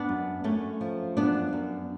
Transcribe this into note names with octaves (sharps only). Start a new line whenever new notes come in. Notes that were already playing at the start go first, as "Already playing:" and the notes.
Already playing: B3 D4
F#2
F#2 A3 C#4
F3
F#2 B3 D4
F#2